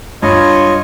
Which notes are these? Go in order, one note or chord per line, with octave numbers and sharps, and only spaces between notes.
G2 F4 C#5 D#5